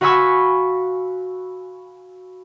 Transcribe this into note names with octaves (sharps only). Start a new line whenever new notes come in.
F#4 F5 G#5 B5 C#6 E6